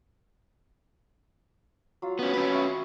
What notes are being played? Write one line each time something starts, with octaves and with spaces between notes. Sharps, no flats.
F#3 F4
B3 C#4
C#4 B4
C#5 E5